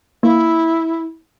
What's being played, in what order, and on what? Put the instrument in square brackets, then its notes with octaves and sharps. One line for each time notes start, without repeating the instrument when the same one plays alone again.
[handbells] A#3 [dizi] E4